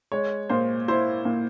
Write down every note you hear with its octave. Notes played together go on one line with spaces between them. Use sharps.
G#3 C#5
A#2 C5
E4 C5
A#2